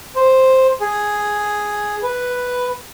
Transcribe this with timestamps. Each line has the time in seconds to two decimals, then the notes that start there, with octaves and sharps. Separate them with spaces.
0.16 C5
0.81 G#4
2.03 B4